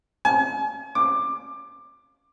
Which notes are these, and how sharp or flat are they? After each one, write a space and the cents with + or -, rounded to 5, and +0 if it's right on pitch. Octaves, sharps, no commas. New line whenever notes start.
G#5 +40
D6 +15